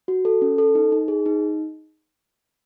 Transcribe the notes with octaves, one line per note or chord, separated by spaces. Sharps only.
F#4
A4
C#4
A4
D#4
D#4
G#4
D#4